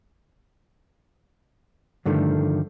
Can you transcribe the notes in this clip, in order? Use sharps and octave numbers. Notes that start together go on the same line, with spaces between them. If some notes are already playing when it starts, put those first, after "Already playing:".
G2 D3 D#3 F3 A3